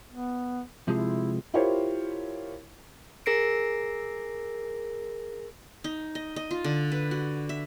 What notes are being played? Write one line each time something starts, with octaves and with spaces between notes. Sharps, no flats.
B3
C3 F3 G#3 E4
E4 F4 G4 A#4 C5 C#5
G#4 A#4 A#6 C7 D7
D#4
D#5
D#5
F4
D3
B4
F#4
E5